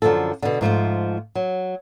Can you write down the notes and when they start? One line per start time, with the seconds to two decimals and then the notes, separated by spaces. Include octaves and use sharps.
0.02 F#2 D3 F3 F4 A4
0.42 B2 D3
0.61 G#2 F3 A3 C5
1.35 F#3